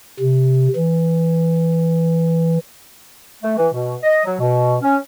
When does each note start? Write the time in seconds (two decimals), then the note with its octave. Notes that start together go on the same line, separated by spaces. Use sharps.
0.20 C3
0.76 E3
3.42 A3
3.57 E3
3.73 B2
4.03 D#5
4.25 F#3
4.40 B2
4.82 C#4